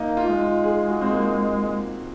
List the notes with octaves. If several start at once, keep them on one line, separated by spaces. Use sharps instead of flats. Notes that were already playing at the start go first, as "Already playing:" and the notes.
Already playing: A#3 D#4
F4
G#3
F4
G#4
F#4
C4
A#3